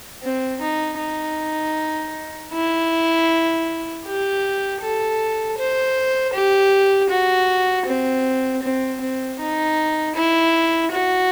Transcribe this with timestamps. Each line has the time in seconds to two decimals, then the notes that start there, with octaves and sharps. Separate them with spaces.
0.23 C4
0.61 D#4
0.99 D#4
2.53 E4
4.06 G4
4.82 A4
5.58 C5
6.33 G4
7.10 F#4
7.87 C4
8.63 C4
9.01 C4
9.40 D#4
10.16 E4
10.92 F#4